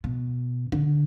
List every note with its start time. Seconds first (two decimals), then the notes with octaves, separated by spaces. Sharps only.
0.04 B2
0.72 D3